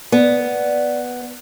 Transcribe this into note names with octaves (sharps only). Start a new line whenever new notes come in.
B3 D5